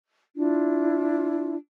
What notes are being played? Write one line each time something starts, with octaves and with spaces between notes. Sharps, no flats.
D4 E4 F4